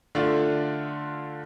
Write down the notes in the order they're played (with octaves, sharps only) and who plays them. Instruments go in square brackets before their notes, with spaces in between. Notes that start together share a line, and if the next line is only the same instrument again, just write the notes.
[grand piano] D3 A3 D4 F4